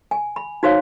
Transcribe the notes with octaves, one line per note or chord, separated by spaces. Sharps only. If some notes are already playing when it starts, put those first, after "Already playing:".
G#5
B5
D#4 F#4 C5 C#5 F5